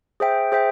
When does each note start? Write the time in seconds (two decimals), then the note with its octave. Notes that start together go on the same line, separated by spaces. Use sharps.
0.20 G#4 C5 E5 G5
0.52 G#4 C5 E5 G5